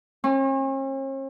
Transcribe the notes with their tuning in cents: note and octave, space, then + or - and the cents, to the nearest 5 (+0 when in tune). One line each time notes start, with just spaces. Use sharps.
C#4 -45